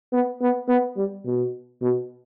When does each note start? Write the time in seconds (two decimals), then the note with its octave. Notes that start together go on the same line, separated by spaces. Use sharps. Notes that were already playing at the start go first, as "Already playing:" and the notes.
0.13 B3
0.42 B3
0.69 B3
0.97 G3
1.26 B2
1.82 B2